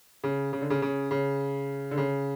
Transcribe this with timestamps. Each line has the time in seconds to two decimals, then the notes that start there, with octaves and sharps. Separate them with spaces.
0.24 C#3
0.53 C#3
0.62 D3
0.70 C#3
0.82 C#3
1.11 C#3
1.91 D3
1.98 C#3